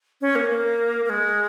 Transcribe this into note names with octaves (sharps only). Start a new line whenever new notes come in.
C#4
A#3
A#3
A#3
G#3